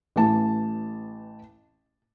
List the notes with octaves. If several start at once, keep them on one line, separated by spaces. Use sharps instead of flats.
A1 E3 A5